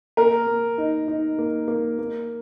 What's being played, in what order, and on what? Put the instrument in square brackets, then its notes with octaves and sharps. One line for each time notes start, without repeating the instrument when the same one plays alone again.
[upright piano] A#3 [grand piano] A#4
[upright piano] A#3
D#4
D#4
A#3
A#3
A#3